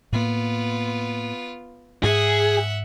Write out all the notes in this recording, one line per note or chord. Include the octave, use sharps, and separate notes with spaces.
A2 A#3 B3 F4
G#2 G#4 E5 F#5